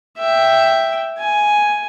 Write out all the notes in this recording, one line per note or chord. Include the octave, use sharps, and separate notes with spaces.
E5 G5
G#5